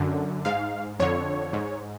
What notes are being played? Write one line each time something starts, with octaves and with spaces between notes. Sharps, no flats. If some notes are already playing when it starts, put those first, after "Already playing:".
Already playing: F#2 D3
G#2 F5
F2 D3 C#5
G#2